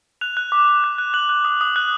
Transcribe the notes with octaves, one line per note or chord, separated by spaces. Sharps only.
F#6 F7
F#6
D6
D6
F#6
F#6
F#6 F#7
F#6
D#6
D#6
F#6